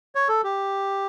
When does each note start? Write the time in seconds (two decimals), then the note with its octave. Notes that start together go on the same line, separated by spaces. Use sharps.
0.15 C#5
0.29 A4
0.44 G4